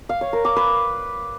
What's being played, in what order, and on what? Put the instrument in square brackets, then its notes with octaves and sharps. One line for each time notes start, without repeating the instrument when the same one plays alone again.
[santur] F5
C#5
A#4
D6
B4